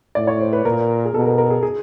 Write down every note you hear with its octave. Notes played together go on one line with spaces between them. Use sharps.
A2 D5
C#5
C5
B4
A#2 A#4
G#4
B2 A4
A#4
A#4
G#4
G#4